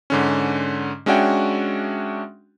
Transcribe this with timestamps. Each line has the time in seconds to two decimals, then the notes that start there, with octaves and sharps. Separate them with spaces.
0.10 G#2 D3 C#4
1.06 G#3 C#4 D4 F#4 E5 G5